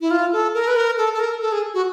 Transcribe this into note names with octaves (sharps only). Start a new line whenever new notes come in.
E4
F4
A4
A#4
B4
A#4
A4
A4
A#4
A4
G#4
F#4